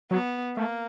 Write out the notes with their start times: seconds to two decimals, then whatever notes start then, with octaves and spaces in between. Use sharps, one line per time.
0.11 F#3 B3
0.56 A3 A#3